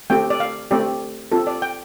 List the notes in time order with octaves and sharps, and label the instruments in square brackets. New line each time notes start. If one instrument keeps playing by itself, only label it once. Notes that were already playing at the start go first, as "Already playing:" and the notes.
[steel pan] A3 C4 G4 G5
D5
F5
A3 C4 G4 D5
C4 F4 A4
D5
G5